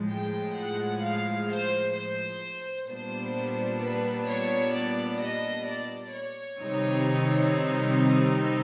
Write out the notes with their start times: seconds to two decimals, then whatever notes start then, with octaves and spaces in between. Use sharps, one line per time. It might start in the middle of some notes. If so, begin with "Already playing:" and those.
Already playing: A2 F3 G#3
0.11 G5
0.57 F#5
1.03 F5
1.50 C5
1.96 C5
2.89 A#2 G3 B3 D4 C5
3.82 B4
4.28 C#5
4.75 D5
5.21 D#5
5.67 D5
6.14 C#5
6.60 C3 D#3 G3 C4 D#4